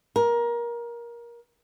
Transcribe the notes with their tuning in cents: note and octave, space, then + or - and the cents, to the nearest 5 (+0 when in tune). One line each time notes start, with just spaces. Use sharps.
A#4 +20